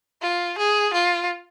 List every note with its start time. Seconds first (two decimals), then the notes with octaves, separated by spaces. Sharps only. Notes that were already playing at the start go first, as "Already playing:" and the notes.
0.22 F4
0.58 G#4
0.94 F4